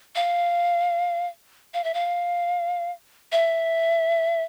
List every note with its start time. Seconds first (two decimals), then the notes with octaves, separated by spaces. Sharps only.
0.15 F5
1.74 F5
1.84 E5
1.94 F5
3.32 E5